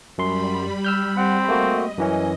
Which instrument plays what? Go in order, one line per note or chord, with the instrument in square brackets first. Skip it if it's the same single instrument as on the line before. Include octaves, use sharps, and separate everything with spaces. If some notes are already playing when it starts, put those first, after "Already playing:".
[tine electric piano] F#2 C6 [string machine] G3 B5
[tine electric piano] E6 F6 G6
[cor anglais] C4 [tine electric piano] F#5
[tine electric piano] A3 A#3 F#4 [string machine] D#5
[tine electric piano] F#2 E3 C#4